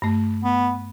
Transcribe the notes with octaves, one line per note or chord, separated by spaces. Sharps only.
G2 A3
B3